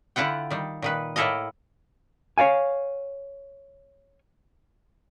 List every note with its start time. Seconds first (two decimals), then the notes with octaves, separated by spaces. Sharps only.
0.16 D3 E4 F4 F#5 G5
0.50 D#3 G3
0.82 A#2 D#3 B4
1.16 A2 A#3 E4 A4 A#4 D#5
2.38 C#5 D5 F5 G#5